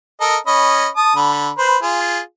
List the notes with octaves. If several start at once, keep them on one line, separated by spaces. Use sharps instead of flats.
A4 A#4 D#5
C#4 D#5 B5
A5 D#6
D3 B5
B4 C5
F4 G#4